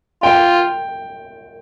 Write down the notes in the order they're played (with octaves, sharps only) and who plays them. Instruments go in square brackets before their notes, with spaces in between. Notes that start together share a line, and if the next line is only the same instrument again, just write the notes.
[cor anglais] F4 [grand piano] G5